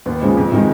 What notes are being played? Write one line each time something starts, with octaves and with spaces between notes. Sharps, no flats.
D#2 B3
C#3 F3 G#3
F2
C3 D#3 G#3